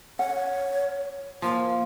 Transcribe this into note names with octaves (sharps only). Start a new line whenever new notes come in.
C#5 F#5
F3 A#3